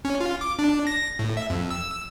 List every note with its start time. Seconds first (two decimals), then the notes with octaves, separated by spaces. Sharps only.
0.05 C#4
0.21 F4
0.41 D6
0.59 D4
0.87 A#6
1.19 A2
1.37 E5
1.50 F2
1.71 E6